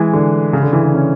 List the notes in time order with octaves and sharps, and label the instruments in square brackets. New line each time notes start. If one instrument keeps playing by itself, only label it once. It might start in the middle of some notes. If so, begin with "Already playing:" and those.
Already playing: [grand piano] E3 G#3
D3
C#3
D3
E3
D3
C#4